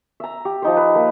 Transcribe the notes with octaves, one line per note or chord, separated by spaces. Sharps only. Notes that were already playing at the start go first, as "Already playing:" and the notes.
E5 A#5
G4
F3 D#4 C5
B4
A#3 B4